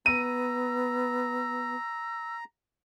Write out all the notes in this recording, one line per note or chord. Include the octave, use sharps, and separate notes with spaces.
B3 A#5 E6 D#7